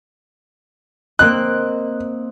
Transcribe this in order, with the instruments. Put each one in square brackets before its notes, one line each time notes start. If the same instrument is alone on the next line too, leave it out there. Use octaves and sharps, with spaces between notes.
[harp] A#3 C4 D#5 [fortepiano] F#6